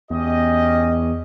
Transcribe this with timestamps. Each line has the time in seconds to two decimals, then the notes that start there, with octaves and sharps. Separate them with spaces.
0.10 E2 C#4 G4 D#5